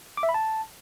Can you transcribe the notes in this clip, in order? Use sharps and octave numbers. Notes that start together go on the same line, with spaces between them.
D6
E5
B5
A5